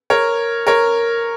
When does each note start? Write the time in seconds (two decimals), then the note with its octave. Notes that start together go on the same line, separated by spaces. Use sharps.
0.10 A#4 C#5
0.67 A#4 C#5